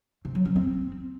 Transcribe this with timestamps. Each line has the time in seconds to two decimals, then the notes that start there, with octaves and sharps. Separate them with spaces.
0.25 C3
0.35 F#3
0.45 C#4
0.56 C4